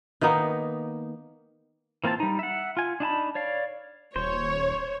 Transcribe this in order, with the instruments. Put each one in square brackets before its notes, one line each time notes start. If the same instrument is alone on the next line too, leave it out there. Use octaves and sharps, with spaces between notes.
[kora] D#3 A#3 B3 D#4
[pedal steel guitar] E3 A#3 C4 F4 A5
G3 D#4
E5 F#5
F4 G#5
D4 D#4 A5 B5
C#5 D5 F5
[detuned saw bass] D#1 [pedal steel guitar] C5 [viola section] C#5